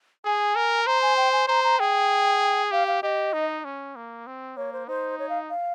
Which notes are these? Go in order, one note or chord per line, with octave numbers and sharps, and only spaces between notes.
G#4 G#5
A#4
C5 A#5
G#5
G5
G#5
C5 A#5
A#5
G#4 G5
G4 F5
F5
G4 D#5
D#4
C#4
A#3
C4
A#3 C#5
C5
D#4 C5
C#5
F5
F5